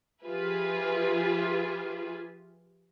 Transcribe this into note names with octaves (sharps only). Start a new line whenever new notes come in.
F3 F4 G4 G#4 B4 E5